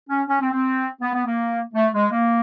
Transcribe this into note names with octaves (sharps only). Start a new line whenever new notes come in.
C#4
C#4
C4
C4
B3
B3
A#3
A3
G#3
A#3